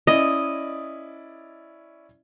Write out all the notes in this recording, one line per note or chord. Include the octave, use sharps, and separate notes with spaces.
C#4 E4 D5 D#5